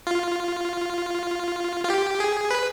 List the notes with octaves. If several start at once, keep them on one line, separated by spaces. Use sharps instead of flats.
F4
F4
G4
G#4
B4